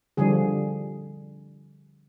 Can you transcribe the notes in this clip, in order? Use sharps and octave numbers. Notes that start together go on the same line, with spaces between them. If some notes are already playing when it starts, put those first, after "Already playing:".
D3 F3 G3 G#4